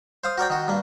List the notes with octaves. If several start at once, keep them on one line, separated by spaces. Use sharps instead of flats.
C5 F5 D#6
F#4 A#4 D5 G5
D#3 F#4
G2 A#3